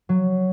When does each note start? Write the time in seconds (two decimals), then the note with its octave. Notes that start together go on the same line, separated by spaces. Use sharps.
0.09 F#3